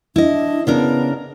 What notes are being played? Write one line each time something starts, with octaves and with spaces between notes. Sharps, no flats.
D4 E4 D#5
C#3 B3 D4 A#4